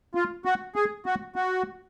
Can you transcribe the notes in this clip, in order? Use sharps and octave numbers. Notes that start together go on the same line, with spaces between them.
F4
F#4
G#4
F#4
F#4